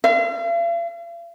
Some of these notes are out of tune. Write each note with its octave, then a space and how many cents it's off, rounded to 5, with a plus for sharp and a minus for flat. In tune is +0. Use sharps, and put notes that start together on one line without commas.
F5 -45